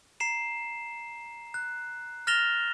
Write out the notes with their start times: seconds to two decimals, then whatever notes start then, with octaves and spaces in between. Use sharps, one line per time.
0.20 A#5 C7 E7
1.54 F#6
2.27 F6 A6 A#6 E7 F7 G7